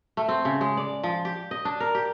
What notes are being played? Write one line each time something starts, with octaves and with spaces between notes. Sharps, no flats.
A3
C4
C#3
G#3
D5
F3
G4
D#5
D4
A#4
G4